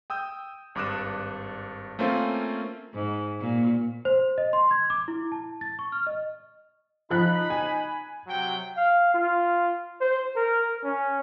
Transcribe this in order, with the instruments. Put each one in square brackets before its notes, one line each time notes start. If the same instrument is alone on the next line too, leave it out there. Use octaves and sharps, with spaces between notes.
[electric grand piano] G5 D#6 E6 G6
G#1 G2 D6 D#6 F#6 E7
A3 A#3 C4 C#4 F4
[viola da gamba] G#2
A#2
[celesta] C5
D#5
C6
G#6
D6
E4
A5
A6
C#6
F6
D#5
[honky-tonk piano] F3 F#6 [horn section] D#4 B5
[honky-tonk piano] G#5
[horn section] C3 F#3 G5
[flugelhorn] F5
F4
C5
A#4
C#4